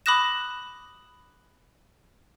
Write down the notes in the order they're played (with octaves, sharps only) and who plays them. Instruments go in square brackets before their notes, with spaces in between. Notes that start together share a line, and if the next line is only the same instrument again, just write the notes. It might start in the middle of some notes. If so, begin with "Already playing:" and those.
[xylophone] B5 D6 D#6 F#6 A#6 E7